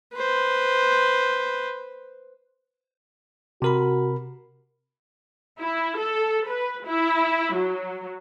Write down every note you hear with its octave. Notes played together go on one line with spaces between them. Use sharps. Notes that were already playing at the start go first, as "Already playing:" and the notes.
B4 C5
C3 F#4 A#4 B5
E4
A4
B4
E4
F#3